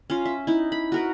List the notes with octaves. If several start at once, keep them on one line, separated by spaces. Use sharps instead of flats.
C#4 F4
E5
D#4 E4
B5
F#4 A#4 B4